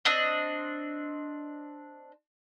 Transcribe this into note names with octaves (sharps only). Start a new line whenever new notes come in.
C4 D4 D#5